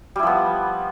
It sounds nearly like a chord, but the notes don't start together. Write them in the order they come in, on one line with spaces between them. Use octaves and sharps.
G3 E4 F3 B3